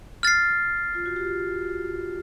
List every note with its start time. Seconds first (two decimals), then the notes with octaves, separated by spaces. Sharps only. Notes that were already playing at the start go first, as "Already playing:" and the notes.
0.23 F6 A6 C7
0.95 F4
1.06 F#4
1.16 F4 G4